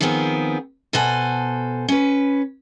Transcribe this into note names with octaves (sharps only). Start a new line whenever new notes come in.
D#3 F3 B3 C4 G#4
B2 A4 C5 F#5 G#5
C#4 B4